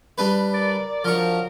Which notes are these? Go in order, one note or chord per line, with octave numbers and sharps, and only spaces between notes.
G3 D4 B4
A#4 D5
F3 F#3 D4 A#4 C#6